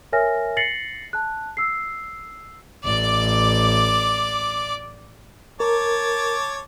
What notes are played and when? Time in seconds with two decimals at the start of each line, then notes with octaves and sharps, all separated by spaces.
0.13 A#4 C#5 E5 G#5 F6 A#6
0.57 A6 A#6 C7 C#7 F#7
1.13 A5 F#6
1.57 E6 C7
2.84 A1 D5 D6
5.60 A#4 C#5 A5 D6